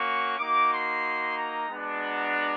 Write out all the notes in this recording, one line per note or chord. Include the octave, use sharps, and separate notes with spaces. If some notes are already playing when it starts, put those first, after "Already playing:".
Already playing: A#3 C#4 F#4 C#6
A#3 D#4 F#4 D6
C6
A#5
G#3 B3 D4 F#4
A#5